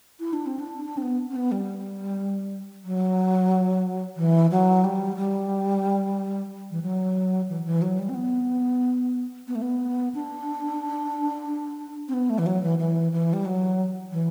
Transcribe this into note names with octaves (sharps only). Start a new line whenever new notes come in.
E4
D4
C4
D4
D4
C4
B3
C4
B3
G3
F#3
E3
F#3
G3
G3
E3
F#3
E3
E3
F#3
G3
C4
B3
B3
A3
B3
D4
C4
B3
A3
E3
F#3
E3
E3
E3
G3
F#3
E3